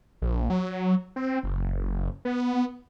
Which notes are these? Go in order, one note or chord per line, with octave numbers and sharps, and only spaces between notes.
A#1
F#3
C4
F#1
B3